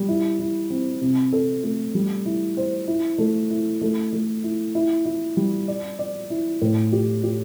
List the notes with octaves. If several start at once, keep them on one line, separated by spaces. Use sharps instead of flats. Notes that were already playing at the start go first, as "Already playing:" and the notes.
Already playing: G3
E4
E4
C4
C3
A4
A3
G3
E4
C5
E4
A3
E4
A3
A3
E4
E4
E4
G3
D5
D5
E4
A2
G4
G4